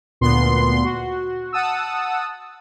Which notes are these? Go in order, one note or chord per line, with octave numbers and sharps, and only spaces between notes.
D2 A#2 B3 C6
F#4
F#5 A5 D#6 E6